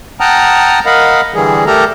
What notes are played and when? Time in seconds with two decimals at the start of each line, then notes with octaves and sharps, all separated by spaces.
0.20 F#5 G5 A5 A#5 D#6 F6
0.86 A#4 D#5 F5 F#5 B5
1.34 D3 E3 G3 G#4
1.67 A3 G4 A4 A#4 A#5